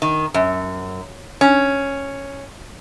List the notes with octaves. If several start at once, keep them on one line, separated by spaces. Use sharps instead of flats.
D#3
F#2
C#4